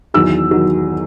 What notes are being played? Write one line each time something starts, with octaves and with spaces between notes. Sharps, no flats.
E2 D#3 F#3 E6
D#3 F#3